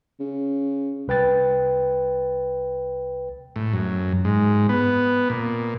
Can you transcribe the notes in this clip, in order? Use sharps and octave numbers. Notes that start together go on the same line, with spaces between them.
C#3
C2 B4 G5 A6
A2
F#2
G#2
B3
A#2